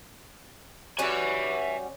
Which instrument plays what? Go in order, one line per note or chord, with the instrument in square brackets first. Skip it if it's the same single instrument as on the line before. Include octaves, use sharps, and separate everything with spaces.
[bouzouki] G3 C#4 F#4 [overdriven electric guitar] E5 G#5